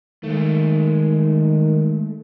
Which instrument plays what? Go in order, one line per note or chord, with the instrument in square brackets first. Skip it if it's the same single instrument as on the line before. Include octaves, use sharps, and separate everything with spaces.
[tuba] D#3 [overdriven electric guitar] G#3 A3